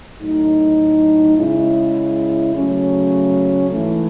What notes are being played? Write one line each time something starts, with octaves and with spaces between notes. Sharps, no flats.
A2 F#3 A3 D#4
C#3 G#3 C#4 E4
C#3 F#3 A3 C#4
G#2 E3 A3